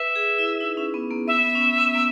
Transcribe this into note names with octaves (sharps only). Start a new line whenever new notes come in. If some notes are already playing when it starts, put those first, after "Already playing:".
Already playing: B4 E5
G#4
E4
D#4
C#4
B3
A#3
B3 E5
B3
C#4
B3
B3
A#3